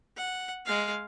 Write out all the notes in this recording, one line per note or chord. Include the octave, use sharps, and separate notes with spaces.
F#5
G#3 F5